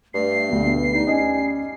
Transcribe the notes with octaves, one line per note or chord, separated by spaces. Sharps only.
G2 A3 C7
D2 B2
G3 D#4
C#4 D#5 G#5